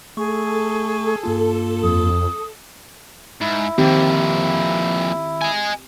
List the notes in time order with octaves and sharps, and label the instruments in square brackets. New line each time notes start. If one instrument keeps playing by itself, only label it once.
[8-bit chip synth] A3 C#6 [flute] G#4 [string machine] A4
[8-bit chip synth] G2 A#3 F4
[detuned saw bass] F2 [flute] D#6
[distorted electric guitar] G#2 [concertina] E4
[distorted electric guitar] F2 A#2 [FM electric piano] D#3 [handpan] C4 G4
[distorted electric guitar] D#5 G#5